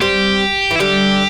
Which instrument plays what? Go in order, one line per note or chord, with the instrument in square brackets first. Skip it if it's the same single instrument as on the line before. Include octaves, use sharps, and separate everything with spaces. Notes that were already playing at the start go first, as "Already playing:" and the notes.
[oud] G3 C4 [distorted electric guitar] G4
[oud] E3
[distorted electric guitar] E4
[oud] D3 G3 [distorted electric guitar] G4